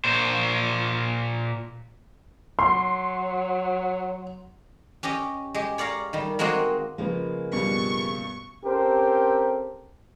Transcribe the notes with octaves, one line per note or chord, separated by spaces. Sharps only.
A#2 C5
F#3 C6
C#4 G4 D#5 G5
G#3 G4
C#5 D5 F5 A#5
D#3 G3
G#3 A#3 C4 F#4 G#4
C#3 F3 G#3 A#3 F4 B4
G2 B2 G3 C#6
C4 C#4 G4 A4 A#4 C5